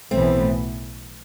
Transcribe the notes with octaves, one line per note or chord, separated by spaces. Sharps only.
B1 A2 E3 A3 B3 C4